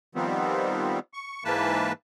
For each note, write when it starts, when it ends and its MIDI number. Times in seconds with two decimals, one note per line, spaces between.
0.15 0.99 51
0.15 0.99 53
0.15 0.99 55
0.15 0.99 59
0.15 0.99 60
1.13 1.44 85
1.45 1.92 44
1.45 1.92 52
1.45 1.92 58
1.45 1.92 71
1.45 1.92 81